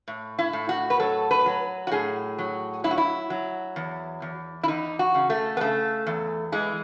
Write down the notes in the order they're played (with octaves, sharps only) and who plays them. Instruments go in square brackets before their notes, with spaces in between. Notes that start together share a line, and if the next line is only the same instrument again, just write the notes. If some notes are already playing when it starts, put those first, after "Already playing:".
[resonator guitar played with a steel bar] A2
E4
A2
F#4
B4
F#3 A4
B4
F#3
F#4
A2 G#4
F#3
F#3 E4
F#4
E4
F#3
E2
E2
E4
E2 D#4
F#4
C#3
A3
B3
C#3 A3
E2
E3 G#3